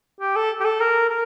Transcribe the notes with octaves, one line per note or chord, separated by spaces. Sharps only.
G4
A4
G4
A4
A#4
A#4